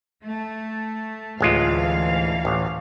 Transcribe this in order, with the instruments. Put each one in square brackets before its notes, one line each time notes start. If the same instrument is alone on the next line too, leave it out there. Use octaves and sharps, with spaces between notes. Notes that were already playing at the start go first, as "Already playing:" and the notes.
[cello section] A3
[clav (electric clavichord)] A1 G#3 F4 [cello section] D2 E3 F5
[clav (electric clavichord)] A1